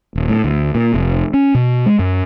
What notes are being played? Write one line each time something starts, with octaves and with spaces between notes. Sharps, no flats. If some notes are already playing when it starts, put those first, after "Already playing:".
D#1
A2
D2
A#2
F1
C#4
B2
G#3
F#2